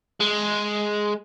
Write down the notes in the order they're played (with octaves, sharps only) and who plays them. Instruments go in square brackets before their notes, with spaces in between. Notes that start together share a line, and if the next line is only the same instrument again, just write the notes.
[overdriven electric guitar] G#3